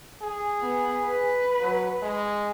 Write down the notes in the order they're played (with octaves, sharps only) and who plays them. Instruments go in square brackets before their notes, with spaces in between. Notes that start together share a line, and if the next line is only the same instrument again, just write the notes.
[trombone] G#4
[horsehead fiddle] B3
B4
[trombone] F#3
G#3